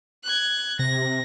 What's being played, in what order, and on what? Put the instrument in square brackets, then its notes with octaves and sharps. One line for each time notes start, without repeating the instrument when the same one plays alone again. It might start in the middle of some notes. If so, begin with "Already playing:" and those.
[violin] F#6 G#6
[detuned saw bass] C3 [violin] A#6